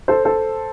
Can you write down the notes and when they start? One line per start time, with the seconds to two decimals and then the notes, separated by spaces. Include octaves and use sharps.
0.08 A4 C5
0.25 A4 C5